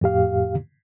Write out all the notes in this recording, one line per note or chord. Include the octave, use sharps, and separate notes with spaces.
F2 A2 G4 F5